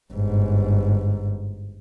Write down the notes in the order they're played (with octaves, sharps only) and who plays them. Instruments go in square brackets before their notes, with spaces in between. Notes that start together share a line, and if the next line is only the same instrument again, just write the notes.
[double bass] G1 G#2